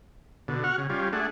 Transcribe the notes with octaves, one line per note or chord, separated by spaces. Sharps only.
B2 D3
F#4 F#5 C#6 F6
C#3
G3 C#4 F4
A3 D4 G#4 F#5